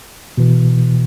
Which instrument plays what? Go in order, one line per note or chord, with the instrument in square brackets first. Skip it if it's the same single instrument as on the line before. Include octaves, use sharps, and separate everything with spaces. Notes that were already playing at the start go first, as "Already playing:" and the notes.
[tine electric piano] B2 E3